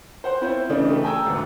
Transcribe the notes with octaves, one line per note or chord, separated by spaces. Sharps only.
C5 F#5 C6
C4 E4 F4 C5 C#5
C#3 E3 A3 D4 D#4
A3 G4
G5 G#5 A#5 E6
G#1 D2